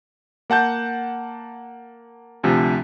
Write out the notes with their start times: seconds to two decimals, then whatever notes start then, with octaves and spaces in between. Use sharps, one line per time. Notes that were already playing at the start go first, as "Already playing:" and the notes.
0.50 A#3 F#5 A5 G6
2.43 D2 C3 F3